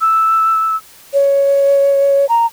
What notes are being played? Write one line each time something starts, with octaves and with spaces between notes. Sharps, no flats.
E6
C#5
A#5